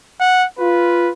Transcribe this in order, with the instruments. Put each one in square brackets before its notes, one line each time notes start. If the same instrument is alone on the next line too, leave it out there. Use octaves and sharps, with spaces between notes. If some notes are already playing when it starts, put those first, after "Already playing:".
[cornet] F#5
[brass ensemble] F4 [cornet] B4